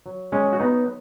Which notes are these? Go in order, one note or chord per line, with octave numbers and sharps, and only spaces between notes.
F#3
G#3 C#4
F#3
F#4
B3 D#4